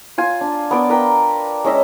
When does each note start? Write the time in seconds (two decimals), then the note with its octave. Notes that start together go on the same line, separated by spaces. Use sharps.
0.18 F4 G#5
0.41 D4
0.71 B3 D5 D6
0.89 A#4 B4 G5
1.64 G#3 C#4 D#5 E5